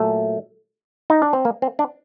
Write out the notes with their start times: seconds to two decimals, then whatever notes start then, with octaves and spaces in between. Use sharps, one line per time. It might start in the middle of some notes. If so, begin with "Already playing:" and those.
Already playing: A#2 F#3 A3
1.10 D#4
1.22 D4
1.33 C4
1.45 A#3
1.62 C4
1.79 D4